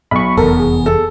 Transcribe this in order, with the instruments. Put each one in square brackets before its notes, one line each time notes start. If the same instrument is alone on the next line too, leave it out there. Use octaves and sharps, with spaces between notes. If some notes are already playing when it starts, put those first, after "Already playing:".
[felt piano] B1 [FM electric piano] B5 C#6
[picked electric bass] F1 E2 [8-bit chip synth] B3 [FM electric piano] A4 A#4
[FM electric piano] G#4
[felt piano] A4